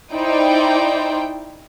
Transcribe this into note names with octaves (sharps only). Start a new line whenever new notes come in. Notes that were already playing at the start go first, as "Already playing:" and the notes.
D#4 E4 C5 D5 G5